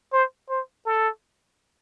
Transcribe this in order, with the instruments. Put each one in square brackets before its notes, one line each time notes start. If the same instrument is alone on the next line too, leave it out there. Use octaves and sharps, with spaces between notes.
[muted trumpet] C5
C5
A4